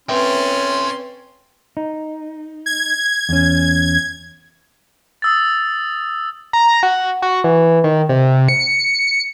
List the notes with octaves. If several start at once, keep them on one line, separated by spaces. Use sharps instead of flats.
C4 C#4 B4 C#5 E5 G5 C6
D#4
G#6
E2 C#4
D#6 E6 A6
A#5
F#4
F#4
E3
D#3
C3
C#7